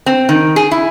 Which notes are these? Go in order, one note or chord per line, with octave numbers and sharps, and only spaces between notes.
C4
D#3
G#4
E4